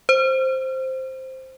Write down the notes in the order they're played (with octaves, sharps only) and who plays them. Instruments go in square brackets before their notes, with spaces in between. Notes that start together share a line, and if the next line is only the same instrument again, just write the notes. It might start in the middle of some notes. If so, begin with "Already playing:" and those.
[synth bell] C5